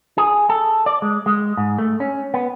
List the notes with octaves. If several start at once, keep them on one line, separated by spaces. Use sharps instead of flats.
G#4
A4
D5
G#3
G#3
G#2
A3
C#4
B3